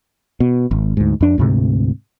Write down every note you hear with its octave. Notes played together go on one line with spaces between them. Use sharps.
B2
G#1
D2 G#2
F2 D4
D2 G#2 C3